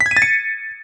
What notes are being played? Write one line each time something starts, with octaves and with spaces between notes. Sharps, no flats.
B6
G#6
D#7
A6
C#7